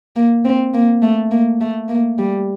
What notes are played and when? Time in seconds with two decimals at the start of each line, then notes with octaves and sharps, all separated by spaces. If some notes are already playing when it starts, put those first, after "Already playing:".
0.16 A#3
0.45 C4
0.74 A#3
1.02 A3
1.31 A#3
1.61 A3
1.89 A#3
2.18 G3